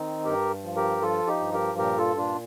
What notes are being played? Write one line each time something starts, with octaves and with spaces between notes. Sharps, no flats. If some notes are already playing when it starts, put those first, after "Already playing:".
Already playing: D#3 C4 D#4
G2 G4 A#4
F3
G4 A#4
F3 F4 A4
D#4 G4
G2
G4 A#4
A#2 G4 A#4
F4 A4
A#2 D4 F4